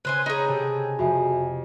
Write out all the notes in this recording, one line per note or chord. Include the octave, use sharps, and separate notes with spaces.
C#3 B4 C5 G#5
D#4 G#4 B4 C#5
C3 G4 A4
F2 F#4 E5 G#5